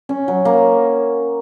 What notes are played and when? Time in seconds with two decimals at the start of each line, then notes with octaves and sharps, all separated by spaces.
0.09 C#4
0.28 F#3
0.45 A#3